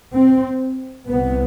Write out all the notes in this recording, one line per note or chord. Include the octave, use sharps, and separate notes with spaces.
C4
C2 C3 B3